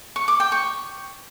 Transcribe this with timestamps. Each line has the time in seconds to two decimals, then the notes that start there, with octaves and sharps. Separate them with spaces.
0.16 C#6
0.28 D6
0.40 G5
0.52 C#6